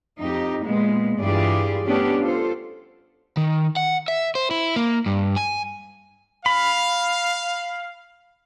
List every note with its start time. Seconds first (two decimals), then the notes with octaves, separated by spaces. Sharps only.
0.20 F2 D#4 G4
0.64 A#2 G#3 B3
1.19 G2 E3 F4 G4 G#4 D5
1.86 A3 B3 C#4 D4 G4
2.21 F4 A4 C5
3.37 D#3
3.77 F#5
4.08 E5
4.35 C5
4.51 E4
4.76 A#3
5.06 G2
5.37 G#5
6.46 F5 B5